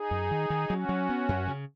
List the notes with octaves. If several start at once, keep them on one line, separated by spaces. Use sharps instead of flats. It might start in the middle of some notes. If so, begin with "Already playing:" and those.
Already playing: D#4 G#4
F#2
D#3
D#3
F#3 C#4 F#4
F#3
B3
F#2
C#3